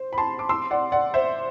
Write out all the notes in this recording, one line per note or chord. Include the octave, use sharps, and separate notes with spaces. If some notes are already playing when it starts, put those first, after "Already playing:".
Already playing: C5
B5
A5 C6
D6
C6 E6
D5 F#5
D5 F#5
C5 E5